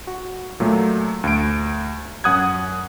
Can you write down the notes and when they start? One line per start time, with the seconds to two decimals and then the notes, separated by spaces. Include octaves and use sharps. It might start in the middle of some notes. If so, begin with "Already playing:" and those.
0.07 F#4
0.60 A#2 F#3 A3
1.24 D2 D7
2.24 F#2 F#5 D#6 F#6 G#6